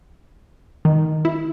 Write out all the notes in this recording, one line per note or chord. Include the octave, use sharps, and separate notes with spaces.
D#3
E4